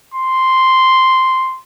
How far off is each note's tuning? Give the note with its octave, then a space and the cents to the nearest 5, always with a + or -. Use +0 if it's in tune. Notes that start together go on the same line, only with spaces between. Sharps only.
C6 -5